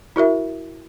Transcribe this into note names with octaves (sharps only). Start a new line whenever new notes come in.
E4 F#4 A#4 E5